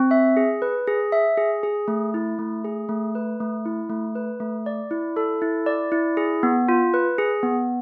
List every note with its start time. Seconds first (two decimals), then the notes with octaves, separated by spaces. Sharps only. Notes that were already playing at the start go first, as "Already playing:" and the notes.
Already playing: C4
0.11 E5
0.37 G#4
0.62 B4
0.87 G#4
1.12 E5
1.37 G#4
1.63 G#4
1.88 A3
2.14 E4
2.39 A3
2.65 G#4
2.89 A3
3.15 B4
3.40 A3
3.65 E4
3.90 A3
4.15 B4
4.40 A3
4.66 D5
4.91 E4
5.16 A4
5.42 E4
5.66 D5
5.92 E4
6.17 G#4
6.43 B3
6.69 F4
6.94 B4
7.18 G#4
7.43 B3